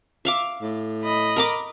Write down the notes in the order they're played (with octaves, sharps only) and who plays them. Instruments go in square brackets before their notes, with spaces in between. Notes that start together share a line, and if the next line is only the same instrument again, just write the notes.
[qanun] E5 F5 D6
[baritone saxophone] A2
[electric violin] D#5 B5
[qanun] A#4 A#5 D6